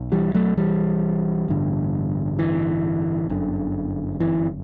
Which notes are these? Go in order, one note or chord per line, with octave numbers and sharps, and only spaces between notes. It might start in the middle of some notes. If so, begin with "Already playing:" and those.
Already playing: B1
E3 G3
F#3 A3
E3 G3
A1 G2 D3
E3
G1 F#2 D3
E3